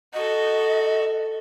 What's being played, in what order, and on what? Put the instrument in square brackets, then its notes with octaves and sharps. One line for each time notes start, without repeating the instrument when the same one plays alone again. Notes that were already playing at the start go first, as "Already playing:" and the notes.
[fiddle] F#4 A4 [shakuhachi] D#5